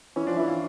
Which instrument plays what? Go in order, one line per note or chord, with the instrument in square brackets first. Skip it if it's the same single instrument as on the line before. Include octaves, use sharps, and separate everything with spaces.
[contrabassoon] E3 [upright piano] C#4
[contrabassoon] F3 [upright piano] D4
[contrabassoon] E3 [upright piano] E4
[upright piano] F4